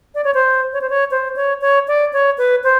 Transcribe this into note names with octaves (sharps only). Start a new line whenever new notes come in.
D5
C#5
C5
C#5
C5
C#5
C5
C#5
C#5
D5
C#5
B4
C5